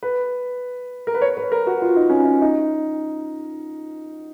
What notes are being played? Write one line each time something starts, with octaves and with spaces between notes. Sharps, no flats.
B4
A#4
B4
C#5
B4
A#4
F#4
F4
D#4
C#4
D#4
D#4